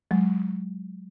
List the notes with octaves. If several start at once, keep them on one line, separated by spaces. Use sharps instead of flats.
F#3 G#3